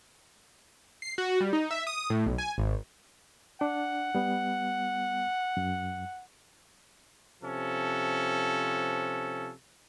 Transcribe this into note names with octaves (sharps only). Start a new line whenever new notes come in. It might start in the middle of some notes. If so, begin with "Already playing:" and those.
C7
F#4
G3
D#4
E5
D#6
A2
B1
G#5
G#1
D4 F#5
G3 B3
F#2
C3 F3 C#4 A4